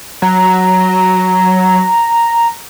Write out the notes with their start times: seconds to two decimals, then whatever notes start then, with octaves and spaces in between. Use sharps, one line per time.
0.22 F#3 A#5